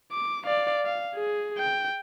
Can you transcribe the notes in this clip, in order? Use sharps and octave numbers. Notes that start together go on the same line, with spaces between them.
D6
D5 F5
F5
G#4
G5